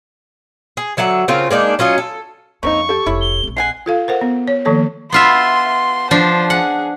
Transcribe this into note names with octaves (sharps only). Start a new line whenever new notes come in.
G#4
D3 F#3 E5 F#5
C#3 C4 F4 A#4
G#3 A#3 D4 D#4
F#3 C#4 F4 D#5
A4
F2 C#3 A#3 C4 D4 D#4 C#6
G4 A4
F1 E4 C#5
G7
A#1 C4
G#3 F#5 G#5 C7
F4 A4 F5
A#4 C5 F#5
B3
C#5
D#3 F3 A#3 A4 C#5
B3 F4 E5 C6
F3 D4 C5
G#4 F#5